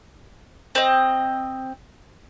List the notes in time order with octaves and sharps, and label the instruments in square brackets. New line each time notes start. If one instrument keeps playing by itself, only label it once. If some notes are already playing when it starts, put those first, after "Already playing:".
[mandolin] C4 D#5